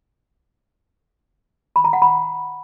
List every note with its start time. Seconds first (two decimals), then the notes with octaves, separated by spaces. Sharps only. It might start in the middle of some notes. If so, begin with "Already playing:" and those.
1.76 B5
1.84 A#5
1.93 F#5
2.02 B5